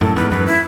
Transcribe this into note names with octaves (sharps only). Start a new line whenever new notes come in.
F#2 A2 A4
E2 G#2 B4
F#2 B4
E4